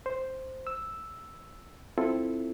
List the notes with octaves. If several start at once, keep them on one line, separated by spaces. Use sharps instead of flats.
C5
E6
C4 E4 F4 A4